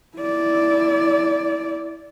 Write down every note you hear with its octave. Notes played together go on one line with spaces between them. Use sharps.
E4 D5